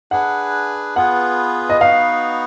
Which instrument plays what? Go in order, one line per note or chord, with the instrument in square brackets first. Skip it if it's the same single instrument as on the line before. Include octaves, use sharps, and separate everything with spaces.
[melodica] D4 G#4 B4 [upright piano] F#5
[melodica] B3 F4 G#4 B4 [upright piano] F#5
[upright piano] D#5
[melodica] B3 D#4 F#4 B4 [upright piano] F5